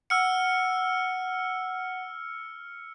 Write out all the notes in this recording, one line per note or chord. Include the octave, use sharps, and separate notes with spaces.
F#5 E6 F6 C#7